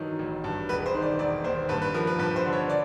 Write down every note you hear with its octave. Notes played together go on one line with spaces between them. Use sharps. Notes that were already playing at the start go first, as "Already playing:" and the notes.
Already playing: G2 D#3 E3 F#3
A1
G2
E1 B4
C5
D#3
D5
E1 D5
D#2 C5
G2 B4
B4
F3 A#4
B4
G2 B4
C5
D3
C#5
D5